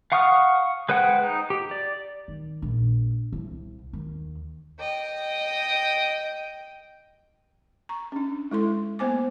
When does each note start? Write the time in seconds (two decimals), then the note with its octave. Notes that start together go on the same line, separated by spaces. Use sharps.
0.12 F5 F#5 C#6 D#6 F6
0.89 G#3 B4 C5 F#5 G5
1.23 D#4
1.50 G4
1.71 D5
2.28 D#3
2.62 A#1
3.32 C2
3.93 D#2
4.80 D#5 G5
7.89 A#5 C#6
8.12 C#4 D4
8.51 G#3 E4 A4 C6
8.99 A#3 B3 C5 G#5 D6